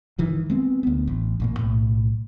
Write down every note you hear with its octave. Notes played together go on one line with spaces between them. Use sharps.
G1 D#3 E3
G#3 B3 C4
D2 B3
A1
A1 A#2 A#3
B1 A2